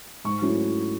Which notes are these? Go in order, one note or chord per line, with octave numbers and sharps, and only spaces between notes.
G#2 C#6
F#3 A3 C#4 E4